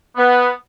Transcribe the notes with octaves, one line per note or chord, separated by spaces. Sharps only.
B3